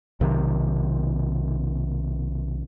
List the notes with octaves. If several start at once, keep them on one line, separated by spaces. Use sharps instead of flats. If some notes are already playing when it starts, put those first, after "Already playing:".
B1 C3 D#3